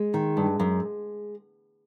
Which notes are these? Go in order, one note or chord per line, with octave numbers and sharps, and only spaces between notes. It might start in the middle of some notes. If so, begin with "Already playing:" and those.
Already playing: G#3
D#3
G2
F#2